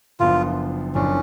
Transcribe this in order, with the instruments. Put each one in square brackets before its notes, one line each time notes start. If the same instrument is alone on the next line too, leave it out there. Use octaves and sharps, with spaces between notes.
[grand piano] F#1 F#2 F3 B3 D4 [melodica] F4
[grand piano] F#1 F#2 F3 B3 D4 [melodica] C#4